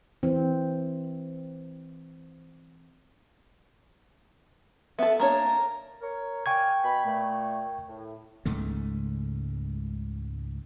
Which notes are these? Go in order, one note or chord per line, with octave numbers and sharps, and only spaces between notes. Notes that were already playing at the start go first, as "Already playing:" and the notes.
E3 C4
B3 A4 E5
A#3 D4 C#5 A#5
A#4 C#5
D5 F5 G5 G#5 C#6 G#6
B2 B5
A#2 A3
A2
C#2 G#2 C#3 A3